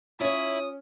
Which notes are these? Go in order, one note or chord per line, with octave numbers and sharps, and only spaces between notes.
C#4 E4 F4 C#5 E5 D#6